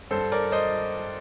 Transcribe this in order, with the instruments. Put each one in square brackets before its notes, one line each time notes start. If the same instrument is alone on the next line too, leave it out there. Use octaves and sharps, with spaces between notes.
[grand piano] G2 A4 C5
A#4 D5
C5 D#5